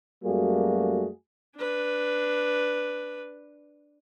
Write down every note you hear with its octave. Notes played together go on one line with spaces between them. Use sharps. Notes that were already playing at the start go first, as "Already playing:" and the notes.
F#2 G3 A3 A#3 F#4 G#4
D4 B4